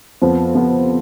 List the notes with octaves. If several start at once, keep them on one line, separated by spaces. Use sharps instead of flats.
F2 F3 B3
F2 F3 B3